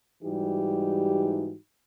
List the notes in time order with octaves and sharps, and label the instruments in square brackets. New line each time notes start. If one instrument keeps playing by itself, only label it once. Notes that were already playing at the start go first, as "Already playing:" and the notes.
[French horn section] G#2 E3 G3 D#4 F#4 G4